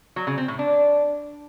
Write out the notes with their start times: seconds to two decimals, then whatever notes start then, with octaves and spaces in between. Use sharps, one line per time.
0.16 F#3
0.27 C#3
0.38 C4
0.48 A2
0.59 D4